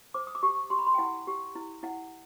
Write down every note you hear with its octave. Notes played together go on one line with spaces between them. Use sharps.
C5 D6
D#6
D6
G4 C#6
G4 C6
B5
C6
G5
E4 F#5
G4
E4
E4 F#5